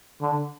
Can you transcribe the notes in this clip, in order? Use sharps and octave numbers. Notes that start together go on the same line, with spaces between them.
D3